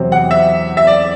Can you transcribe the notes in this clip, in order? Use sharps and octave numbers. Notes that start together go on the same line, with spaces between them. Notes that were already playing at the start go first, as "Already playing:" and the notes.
Already playing: E2 C3 F#3 C4
F#5
E5
E5
D5